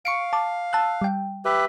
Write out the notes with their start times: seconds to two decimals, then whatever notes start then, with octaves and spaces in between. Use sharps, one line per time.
0.05 F5 C#6 C#7 D7
0.33 A5 D6
0.73 A5 E6 F#6
1.02 G3 G5
1.45 G4 B4 E5